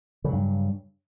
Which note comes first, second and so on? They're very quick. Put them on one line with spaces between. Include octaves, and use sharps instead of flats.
C#3 F#3 G2